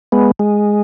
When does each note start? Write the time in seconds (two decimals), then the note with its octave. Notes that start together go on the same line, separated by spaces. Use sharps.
0.12 G#3 B3
0.39 G#3